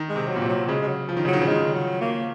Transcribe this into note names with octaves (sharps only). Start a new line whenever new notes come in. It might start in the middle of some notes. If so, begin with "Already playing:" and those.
Already playing: D#3
G#3
C3
F#3
A#2
C3
F#3
C#3 G#3
G#3
F#3
F3
D#3
C#3 F#3
D#3
C#3
D#3 G#3
F#3
A#3